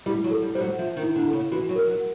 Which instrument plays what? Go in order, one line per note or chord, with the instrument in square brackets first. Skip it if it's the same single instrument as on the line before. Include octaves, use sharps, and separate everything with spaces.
[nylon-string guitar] G3 [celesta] E4
[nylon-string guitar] F#3
[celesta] A4
[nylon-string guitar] G3
[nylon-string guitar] G3 [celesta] C5
[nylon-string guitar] F#3
[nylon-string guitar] F3 [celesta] E5
[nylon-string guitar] D#3
[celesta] E4
[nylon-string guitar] D3
[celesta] A4
[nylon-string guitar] C#3
[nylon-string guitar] E3 [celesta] F#4
[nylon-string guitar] F#3
[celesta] A#4
[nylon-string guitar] F#3